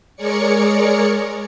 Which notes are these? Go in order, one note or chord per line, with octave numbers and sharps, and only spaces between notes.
G#3 G#4 A#4 C#5 D5 C#7